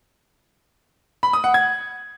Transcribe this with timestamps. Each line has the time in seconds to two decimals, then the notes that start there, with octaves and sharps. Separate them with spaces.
1.23 B5
1.33 D#6
1.44 F#5
1.54 G#6